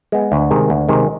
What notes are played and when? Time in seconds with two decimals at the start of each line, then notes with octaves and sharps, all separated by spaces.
0.12 G#3 B3
0.32 D2
0.51 C3 D#3 G#3
0.70 D2
0.89 C3 D#3 G#3